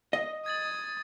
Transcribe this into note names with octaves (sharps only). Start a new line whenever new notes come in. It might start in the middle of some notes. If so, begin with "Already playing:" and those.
D#5
D#6 G#6 A6 F#7